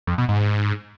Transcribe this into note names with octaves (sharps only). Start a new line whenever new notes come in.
F2
B2
G#2